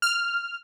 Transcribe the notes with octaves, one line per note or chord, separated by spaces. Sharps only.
F6